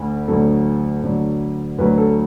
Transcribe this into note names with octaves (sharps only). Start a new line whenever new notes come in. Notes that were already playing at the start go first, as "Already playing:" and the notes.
Already playing: D2 D3
D2 D3 F#3 A4
D2 D3 F#3
D2 D3 F#3 B4
A4